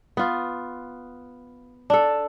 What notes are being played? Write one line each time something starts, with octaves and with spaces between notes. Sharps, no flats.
B3 F4
D4 A4